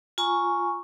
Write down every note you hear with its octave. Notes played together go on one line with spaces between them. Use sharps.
F4 G#5 A#5 C#6